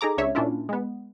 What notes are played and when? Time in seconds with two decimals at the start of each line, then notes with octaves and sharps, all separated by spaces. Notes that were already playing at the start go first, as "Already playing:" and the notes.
0.01 D#4 G#4 A4 A#5 D6
0.18 C#2 D4 C#5 E5
0.35 A#2 C#4 D4 E4 F4
0.69 G#3 B3